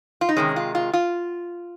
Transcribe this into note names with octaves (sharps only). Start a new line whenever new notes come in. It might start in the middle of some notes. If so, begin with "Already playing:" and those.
F4
D#4
C3 D#3 G#3 C#4
F4
F4
F4